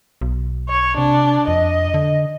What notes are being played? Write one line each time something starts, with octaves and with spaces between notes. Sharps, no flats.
B1
C#5
C3 D4
F2 D#5
D3